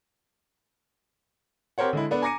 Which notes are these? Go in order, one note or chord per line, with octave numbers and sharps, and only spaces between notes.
C4 G4 A#4 C5 C#5 F#5
D3 G#3 E4
B3 D4 A4
G#5 A#5 D6 A#6 C#7 D#7